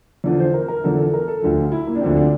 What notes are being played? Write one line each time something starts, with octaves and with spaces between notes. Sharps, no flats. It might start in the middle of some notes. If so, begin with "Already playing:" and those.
E2 D3 F3
C5
A#4
A#4
E2 D3 F3 A4
A4
A#4
A4
D2 D3 F3 A4
F4
E4
A#3
D4
D2 D3 F3 C4
D4